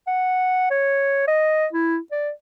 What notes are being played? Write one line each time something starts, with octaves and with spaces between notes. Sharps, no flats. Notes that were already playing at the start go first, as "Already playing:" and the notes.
F#5
C#5
D#5
E4
D5